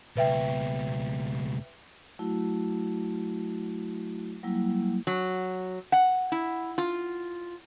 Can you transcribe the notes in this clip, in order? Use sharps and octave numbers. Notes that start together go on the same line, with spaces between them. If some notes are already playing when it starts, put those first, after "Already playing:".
C#2 B2 B4 E5 G5
F#3 A3 E4 F#4
F#3 G3 A#3 E4
F#3
F#5
E4
F4